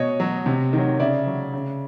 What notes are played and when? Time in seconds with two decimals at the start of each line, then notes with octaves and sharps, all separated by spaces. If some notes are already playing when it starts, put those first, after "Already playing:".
Already playing: B2 C#5 D#5
0.20 F#3
0.46 C3
0.73 D#3 F#3
1.00 C#3 D5 E5
1.27 F#3
1.53 C#3